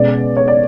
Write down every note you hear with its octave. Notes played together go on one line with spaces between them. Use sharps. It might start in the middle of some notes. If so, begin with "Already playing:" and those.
Already playing: B2 G#3 C#4 D5
C#5
D5